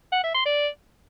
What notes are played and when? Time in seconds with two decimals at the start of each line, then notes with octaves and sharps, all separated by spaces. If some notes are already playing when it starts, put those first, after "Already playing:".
0.12 F#5
0.23 E5
0.34 C6
0.45 D5